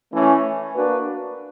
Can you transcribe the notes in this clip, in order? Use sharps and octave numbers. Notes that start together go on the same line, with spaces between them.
E3 A3 C#4
A#3 D4 F#4 B4